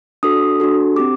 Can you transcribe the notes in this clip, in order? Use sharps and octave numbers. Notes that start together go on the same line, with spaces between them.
D4 F#4 A4 D#6
D4 F#4 A4
C4 G4 D6